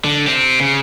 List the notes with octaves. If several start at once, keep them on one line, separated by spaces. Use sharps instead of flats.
D3
C4 G4
C#3